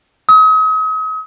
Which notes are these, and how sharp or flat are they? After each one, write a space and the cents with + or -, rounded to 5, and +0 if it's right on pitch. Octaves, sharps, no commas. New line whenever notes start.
D#6 +40